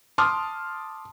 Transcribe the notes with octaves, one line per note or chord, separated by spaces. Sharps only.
A5 C6 D6 D#6 F6